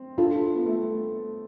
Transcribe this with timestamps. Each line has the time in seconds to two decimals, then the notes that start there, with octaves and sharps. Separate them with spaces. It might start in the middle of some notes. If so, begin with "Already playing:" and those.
Already playing: C4
0.18 D4 F4 A4
0.54 B3
0.66 A3